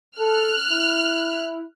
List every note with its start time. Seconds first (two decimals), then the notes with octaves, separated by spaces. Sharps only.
0.19 A4 F6 F#6
0.70 E4